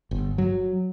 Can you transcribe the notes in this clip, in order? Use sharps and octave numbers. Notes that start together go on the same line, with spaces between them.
G1
F#3